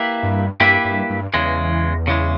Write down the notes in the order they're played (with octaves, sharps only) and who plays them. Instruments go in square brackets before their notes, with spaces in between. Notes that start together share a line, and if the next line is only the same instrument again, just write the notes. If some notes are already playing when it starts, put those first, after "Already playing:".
Already playing: [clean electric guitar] A#3 E4 G4 B4 E5
[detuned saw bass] G2
[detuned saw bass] G2 [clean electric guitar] A#3 E4 G4 B4 E5
[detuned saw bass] G2
G2
[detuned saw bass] E2 [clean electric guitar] C#3 E3 G#3
[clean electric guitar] C#3 E3 G#3